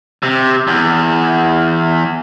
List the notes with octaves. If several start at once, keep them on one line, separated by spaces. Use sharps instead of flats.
C3
E2